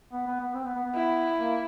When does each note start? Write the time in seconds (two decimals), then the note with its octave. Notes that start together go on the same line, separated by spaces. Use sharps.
0.12 B3
0.27 B3
0.41 B3
0.54 C4
0.64 B3
0.75 B3
0.85 B3
0.95 E4
1.37 A#3